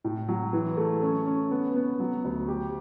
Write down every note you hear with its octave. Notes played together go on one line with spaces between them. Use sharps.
A2
F#3
E3
A3
C#4
C#4
B3
B3
F#3
D2
G4